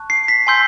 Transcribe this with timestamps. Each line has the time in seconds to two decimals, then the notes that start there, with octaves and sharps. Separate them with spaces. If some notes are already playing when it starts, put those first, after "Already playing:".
Already playing: A5 C#6 F#6
0.10 C7
0.28 B6
0.47 G#5 C6 E6 G6